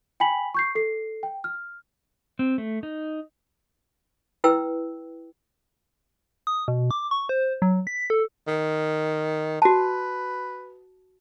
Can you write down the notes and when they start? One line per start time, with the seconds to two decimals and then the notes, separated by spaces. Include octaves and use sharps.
0.20 G5 G#5 B5 B6 F#7
0.54 C#6 G6 C7
0.75 A4 C7
1.23 G5
1.44 F6
2.39 C4
2.58 A3
2.83 D#4
4.44 E4 B4 G5 E6
6.47 D#6
6.68 B2
6.91 D6
7.11 C#6
7.29 C5
7.62 F#3
7.87 B6
8.10 A4
8.47 D#3
9.62 F#4 B4 A5